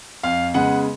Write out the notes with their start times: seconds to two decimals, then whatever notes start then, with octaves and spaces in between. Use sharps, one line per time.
0.23 F2 F5
0.54 C#3 G#3 B3 F#5